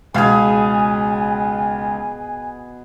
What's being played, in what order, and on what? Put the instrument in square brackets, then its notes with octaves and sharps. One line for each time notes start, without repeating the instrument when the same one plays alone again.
[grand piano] C#2 F5 [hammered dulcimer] B2 G#4 [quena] G#5